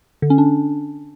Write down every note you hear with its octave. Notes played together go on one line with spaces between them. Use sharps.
D3
C#4
D4